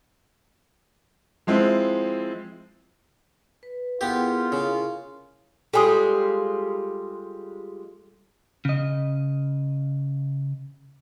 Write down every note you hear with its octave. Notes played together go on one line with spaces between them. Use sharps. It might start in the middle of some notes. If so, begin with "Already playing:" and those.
F3 G#3 C4 E4
B4
B3 E4 F4 G4 G#4 A#4
C#3
G3 G#3 F4 A4 G#5 D#6
C#3 D#5